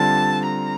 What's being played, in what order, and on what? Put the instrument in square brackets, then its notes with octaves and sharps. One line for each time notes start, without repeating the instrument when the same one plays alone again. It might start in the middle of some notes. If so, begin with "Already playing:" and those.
Already playing: [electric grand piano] D3 G3 C4 F4 [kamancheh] A5
[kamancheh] A#5